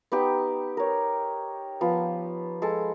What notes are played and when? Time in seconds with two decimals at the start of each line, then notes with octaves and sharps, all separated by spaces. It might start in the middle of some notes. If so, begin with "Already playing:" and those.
0.12 B3 D#4 G4 G5
0.77 A#4 C#5
1.81 F3 B3
2.62 G#3 A4